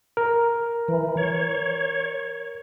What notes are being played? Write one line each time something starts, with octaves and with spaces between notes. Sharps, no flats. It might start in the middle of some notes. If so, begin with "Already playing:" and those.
A#4
E3
C#5